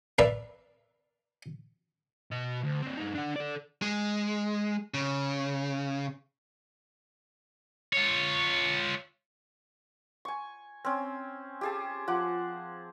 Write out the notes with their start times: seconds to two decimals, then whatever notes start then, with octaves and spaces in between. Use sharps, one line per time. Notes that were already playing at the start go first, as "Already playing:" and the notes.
0.19 A#4 B4 D5 E5
2.32 B2 D#5
2.64 D2
2.83 C4 D4
2.97 G2 D#4
3.15 D4 F#5
3.36 A4 D5
3.82 G#3
4.94 C#3
7.93 F4 C#5
10.25 G#5 C#6
10.85 C4 C#4
11.61 G4 G#4 A5
12.08 F3 F#5 D6